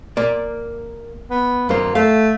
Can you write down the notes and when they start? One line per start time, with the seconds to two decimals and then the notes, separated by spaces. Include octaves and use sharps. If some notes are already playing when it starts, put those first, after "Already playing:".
0.17 A#3 D5
1.31 B3
1.69 F#2 A#3 C5
1.95 A3 F5